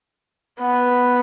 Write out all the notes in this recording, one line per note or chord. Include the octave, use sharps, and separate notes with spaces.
B3